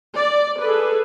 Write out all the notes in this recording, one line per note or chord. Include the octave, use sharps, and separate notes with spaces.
D5
G#4 A4 B4